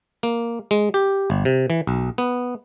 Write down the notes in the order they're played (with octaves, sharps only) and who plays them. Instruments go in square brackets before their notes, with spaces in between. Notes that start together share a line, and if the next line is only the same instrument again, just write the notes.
[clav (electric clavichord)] A#3
G#3
G4
G1
C3
E3
B1
B3